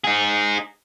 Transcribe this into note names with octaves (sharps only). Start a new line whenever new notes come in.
D#4 G#4